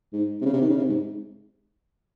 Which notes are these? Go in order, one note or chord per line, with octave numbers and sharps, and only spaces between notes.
G#2
C3
C#3
C3
D#3
C#3
C3
G#2